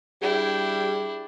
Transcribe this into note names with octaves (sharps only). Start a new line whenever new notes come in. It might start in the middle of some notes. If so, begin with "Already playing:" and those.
G3 D4 E4 G#4 G5